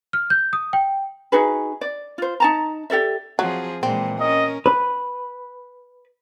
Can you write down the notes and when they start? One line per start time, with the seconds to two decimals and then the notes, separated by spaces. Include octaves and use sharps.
0.13 F6
0.30 G6
0.53 D#6
0.73 G5
1.32 D#4 F#4 G#4 B4
1.81 D5
2.18 F4 C5
2.40 D#4 A5 A#5
2.90 G4 A4 D5 E5
3.39 F3 F#3 C4 G#4
3.83 A#2 E3 G#3 C4
4.20 C#4 A#4 D#5
4.66 B4